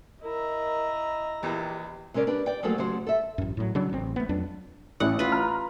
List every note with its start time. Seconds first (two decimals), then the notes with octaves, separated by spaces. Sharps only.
0.24 E4 A#4 D#5 A#5
1.43 A#1 E2 G4
2.14 C3 G#3 C#4 A#4 D5
2.27 D4 G4 B4
2.46 D5 G5
2.63 F3 F#3 A3 A#3 G#4 A4
2.78 C#3 F#3 A3 G4 C5
3.07 A4 E5
3.38 A1 F#2
3.57 A2 F#3
3.75 C#3 F#3 D4
3.93 A1 C4
4.16 A3 B3
4.29 F2 F#3 D4
5.00 A1 E4 F#5
5.19 F4 B4
5.32 A#5 F6